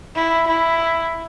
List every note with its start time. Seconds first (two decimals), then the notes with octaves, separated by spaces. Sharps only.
0.15 E4
0.47 E4